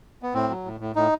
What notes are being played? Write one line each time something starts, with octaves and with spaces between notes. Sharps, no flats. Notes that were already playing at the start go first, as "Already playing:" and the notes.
B3
A2 C4
F#3
A2
A2
A2 D#4